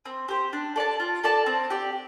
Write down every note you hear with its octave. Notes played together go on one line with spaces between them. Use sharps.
C4
G4 C5
D4
A4 D5 A5
F4
A4 D5 A5
C4
G4 D5